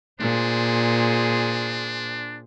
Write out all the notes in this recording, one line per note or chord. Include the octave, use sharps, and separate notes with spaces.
A#2 D4 G#4 C5